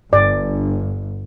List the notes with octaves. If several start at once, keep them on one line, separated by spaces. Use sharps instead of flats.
G1 G2 D5